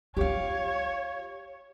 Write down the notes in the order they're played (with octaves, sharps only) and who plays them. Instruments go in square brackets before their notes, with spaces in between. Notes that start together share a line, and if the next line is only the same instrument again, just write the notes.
[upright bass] D#4 F4 [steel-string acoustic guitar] G4 F5 [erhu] C#5